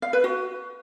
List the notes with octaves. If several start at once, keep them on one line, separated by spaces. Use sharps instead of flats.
F5
B4
F#4